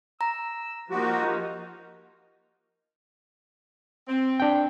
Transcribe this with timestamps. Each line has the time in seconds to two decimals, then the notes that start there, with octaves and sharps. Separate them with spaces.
0.21 A#5 E6
0.91 F3 A#3 D#4 F#4 G4
4.09 C4
4.40 D4 G5